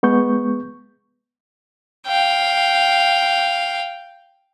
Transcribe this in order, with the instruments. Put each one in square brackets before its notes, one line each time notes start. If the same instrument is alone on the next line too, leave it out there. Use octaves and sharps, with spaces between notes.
[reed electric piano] G#3 B3 C#6 G6
[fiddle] F5 G5